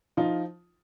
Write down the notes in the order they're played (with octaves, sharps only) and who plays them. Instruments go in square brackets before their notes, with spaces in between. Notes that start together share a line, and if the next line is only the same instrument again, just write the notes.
[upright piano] F3 D#4 F4